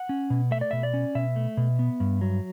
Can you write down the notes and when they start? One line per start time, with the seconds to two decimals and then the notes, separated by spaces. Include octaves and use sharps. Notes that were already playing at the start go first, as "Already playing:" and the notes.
Already playing: F#5
0.09 C#4
0.30 B2
0.51 A3 E5
0.61 D5
0.71 B2 E5
0.83 D5
0.94 C#4
1.15 B2 E5
1.36 A3
1.57 B2
1.79 B3
2.00 G2
2.21 F#3